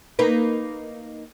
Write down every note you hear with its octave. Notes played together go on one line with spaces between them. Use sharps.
A#3 D#4 B4